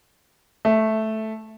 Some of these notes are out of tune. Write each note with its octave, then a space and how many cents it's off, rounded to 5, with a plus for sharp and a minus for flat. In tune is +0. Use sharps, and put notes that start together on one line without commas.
A3 -5